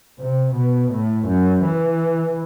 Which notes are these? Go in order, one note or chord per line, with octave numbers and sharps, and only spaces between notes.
C3
B2
A2
F#2
E3